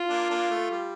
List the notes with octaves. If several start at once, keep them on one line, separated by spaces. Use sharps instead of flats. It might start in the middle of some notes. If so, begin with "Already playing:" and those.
Already playing: F4
A#3 D4
A#3 D4
A3
G3